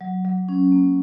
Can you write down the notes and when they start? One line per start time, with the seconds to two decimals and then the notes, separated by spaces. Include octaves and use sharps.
0.01 F#3
0.25 F#3
0.49 C#4
0.72 A#3